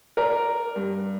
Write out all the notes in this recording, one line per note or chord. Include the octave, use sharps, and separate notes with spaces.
A#4 D5 A#5
G2